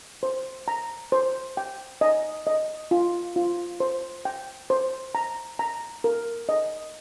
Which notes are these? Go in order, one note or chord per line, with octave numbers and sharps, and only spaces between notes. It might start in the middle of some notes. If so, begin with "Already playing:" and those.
C5
A#5
C5
G5
D#5
D#5
F4
F4
C5
G5
C5
A#5
A#5
A#4
D#5